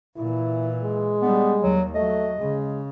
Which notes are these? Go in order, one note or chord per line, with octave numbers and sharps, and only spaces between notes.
A#2 E3 E4
G#3
G3 B3 D4
D#2 F#3
F#3 A3 D#5
C#3 G#3